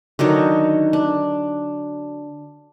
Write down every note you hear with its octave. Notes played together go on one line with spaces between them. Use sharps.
D3 D#3 F#3 D#4
D4